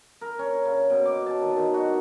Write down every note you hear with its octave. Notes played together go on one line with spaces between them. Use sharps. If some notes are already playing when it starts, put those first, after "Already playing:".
A#4
C#4
C#3
B2
D6
A5
D#3
D#3
F#4